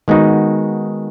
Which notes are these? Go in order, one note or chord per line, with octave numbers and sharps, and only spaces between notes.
D#3 G#3 B3 D#4 F#4